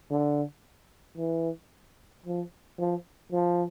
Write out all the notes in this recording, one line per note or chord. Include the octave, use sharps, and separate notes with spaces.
D3
E3
F3
F3
F3